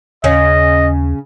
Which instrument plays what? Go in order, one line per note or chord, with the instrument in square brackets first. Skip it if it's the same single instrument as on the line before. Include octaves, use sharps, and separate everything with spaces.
[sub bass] D#2 [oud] C#3 C#4 [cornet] D#5